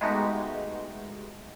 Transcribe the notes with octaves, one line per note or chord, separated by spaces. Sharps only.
G#3 A3 B3 D#4 F#4 G4